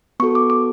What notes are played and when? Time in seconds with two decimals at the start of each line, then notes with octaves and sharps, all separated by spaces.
0.20 B3 F#4 A4 C#6
0.35 D6
0.50 D6